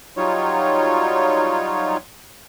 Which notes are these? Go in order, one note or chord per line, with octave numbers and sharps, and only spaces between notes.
F#3 G3 D#4 F4 C#5